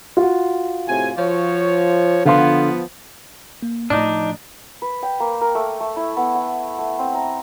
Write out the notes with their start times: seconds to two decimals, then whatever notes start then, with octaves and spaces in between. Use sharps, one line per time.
0.17 F4 F#4
0.88 A2 C3 G#5
1.17 F3 C#5
2.25 D3 F3 B3 F5 C6
3.62 A#3
3.90 A2 F3 D4 D#4 D5 D6
4.82 B4
5.02 G5
5.20 A#3
5.41 A#4
5.55 A3
5.80 A3
5.96 E4
6.17 B3
6.35 F#5
6.79 A3
6.99 C4
7.15 A#5